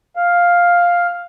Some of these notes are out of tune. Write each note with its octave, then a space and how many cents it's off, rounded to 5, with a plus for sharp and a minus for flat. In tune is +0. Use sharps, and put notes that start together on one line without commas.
F5 +5